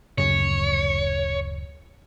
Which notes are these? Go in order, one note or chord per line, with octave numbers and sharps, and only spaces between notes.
D1 F#2 C#3 C#5